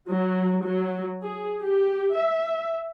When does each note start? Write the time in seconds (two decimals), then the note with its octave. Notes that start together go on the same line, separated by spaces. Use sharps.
0.10 F#3
0.63 F#3
1.23 G#4
1.63 G4
2.15 E5